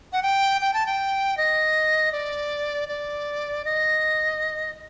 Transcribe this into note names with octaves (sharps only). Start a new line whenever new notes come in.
F#5
G5
G5
A5
G5
D#5
D5
D5
D#5